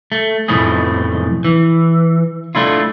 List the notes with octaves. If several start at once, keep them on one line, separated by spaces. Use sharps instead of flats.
A3
B1 F2 A2 F3 A3 G#4
E3
A3 D4 E4 F4